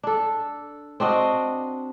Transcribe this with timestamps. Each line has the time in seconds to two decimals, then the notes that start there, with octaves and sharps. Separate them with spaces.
0.03 D4 A4
1.00 C4 D4 F#4 D#5